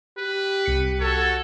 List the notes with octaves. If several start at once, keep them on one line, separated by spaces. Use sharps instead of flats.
G4 B4
C2 C#7
F#4 A4 C#5